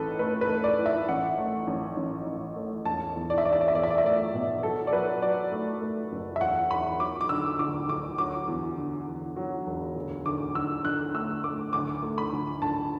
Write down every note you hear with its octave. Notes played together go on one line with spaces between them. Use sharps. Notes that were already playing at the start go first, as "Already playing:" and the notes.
Already playing: A1 A2 A4 B4
A3 B4
B4
A3
D5
A2
E5
A1 F#5
A3
A1
A1
A1
A3
E1 A5
E2
D5
E5
E1 D5
E5
D5
E5
E2 D5
E5
D5
E5
A3 D5
B2
F#3 A4
D5
F#3 B4
F#3 D5
A3
A3
F#1
E5
E1 F#5
E1 B5
F#3 D6
D6
D3 E6
D2 D6
D2 D6
F#3 D6
E2
D3
E2
F#3
E1
D2
D2 D6
D2 E6
D3 F#6
A3 E6
A3 D6
D2 D6
A3
B5
D2
D2 A5